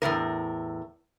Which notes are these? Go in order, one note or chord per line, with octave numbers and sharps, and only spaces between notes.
E2 A2 C#3 A#4